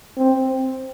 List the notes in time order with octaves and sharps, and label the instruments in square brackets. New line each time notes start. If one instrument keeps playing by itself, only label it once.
[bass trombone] C4